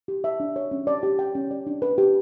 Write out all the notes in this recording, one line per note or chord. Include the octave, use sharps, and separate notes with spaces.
G4
E5
D4
C#5
C#4
D5
G4
G5
C#4
D5
D4
B4
G4